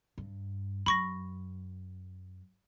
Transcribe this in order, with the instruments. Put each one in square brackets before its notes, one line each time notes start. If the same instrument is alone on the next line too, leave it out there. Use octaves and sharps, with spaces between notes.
[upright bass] G2
[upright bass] F#2 [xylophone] B5 C#6 A#6